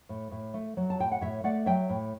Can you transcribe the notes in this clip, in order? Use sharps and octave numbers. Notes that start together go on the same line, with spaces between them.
A2
A2
A3
F#3
A5
A2 G5
F#5
A2 C#5 E5
A3 D5 F#5
F#3 E5 G5
A2